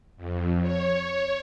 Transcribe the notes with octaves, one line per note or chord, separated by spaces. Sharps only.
F2
C#5